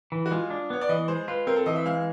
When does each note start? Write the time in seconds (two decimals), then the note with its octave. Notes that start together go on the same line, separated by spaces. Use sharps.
0.12 E3
0.26 F#4
0.31 G#3 F4
0.50 D4
0.70 B3 C#5
0.81 D5
0.89 E3 D#5
1.08 G#3 C5
1.28 F4 B4
1.47 C4 A#4
1.56 A4
1.66 E3 D#5
1.76 E5
1.86 G#3 F5